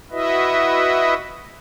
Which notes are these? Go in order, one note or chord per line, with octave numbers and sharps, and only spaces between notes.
E4 F#4 B4 D#5 E5